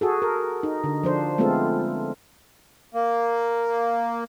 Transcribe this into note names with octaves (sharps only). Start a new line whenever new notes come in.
F#4 G#4 A4
A#4
D#4
D3
F3 D4 C5
G#3 A3 B3 C4 F4 A4
A#3